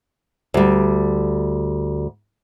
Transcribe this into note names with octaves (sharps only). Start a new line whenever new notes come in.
D2 G3